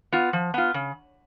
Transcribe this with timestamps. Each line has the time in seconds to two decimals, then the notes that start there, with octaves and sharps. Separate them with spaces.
0.12 B3 F4
0.33 F3
0.54 B3 F4
0.74 C#3